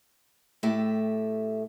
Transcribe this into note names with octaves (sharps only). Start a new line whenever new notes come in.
A2 A3 G4 E5